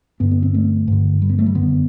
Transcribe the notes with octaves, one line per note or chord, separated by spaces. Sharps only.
G2 D3 B3
B3
C4
A3
G2 D3
G3
B3
A3
G3
F#2 D3 B3